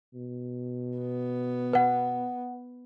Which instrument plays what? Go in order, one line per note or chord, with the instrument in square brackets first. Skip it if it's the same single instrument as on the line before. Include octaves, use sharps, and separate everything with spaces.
[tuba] B2
[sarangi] B3
[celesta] B4 F#5